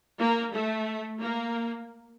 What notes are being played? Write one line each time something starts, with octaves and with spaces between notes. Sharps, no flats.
A#3
A3
A#3